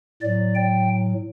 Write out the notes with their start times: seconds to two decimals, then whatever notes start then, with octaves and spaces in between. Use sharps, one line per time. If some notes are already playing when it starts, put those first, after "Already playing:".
0.22 A2 F#3 D5
0.55 G5